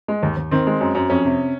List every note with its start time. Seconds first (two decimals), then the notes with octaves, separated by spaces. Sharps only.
0.08 G#3
0.23 D#2
0.37 D#2
0.51 D#3 C4
0.67 G#3
0.81 F#2
0.95 F#2
1.10 F2 C#4
1.25 C3